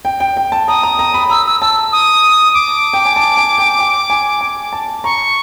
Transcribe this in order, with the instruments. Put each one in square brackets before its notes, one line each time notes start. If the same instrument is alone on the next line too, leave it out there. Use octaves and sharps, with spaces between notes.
[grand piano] G5
G5
G5
A5
[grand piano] A#5 [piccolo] D#6
[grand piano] A#5
A#5
B5
[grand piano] A#5 [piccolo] E6
[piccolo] E6
[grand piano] A5 [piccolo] E6
[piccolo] D#6
D6
[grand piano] G5
G#5
A5
G#5
G5
G5
G#5
G#5
A5
[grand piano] A#5 [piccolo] C#6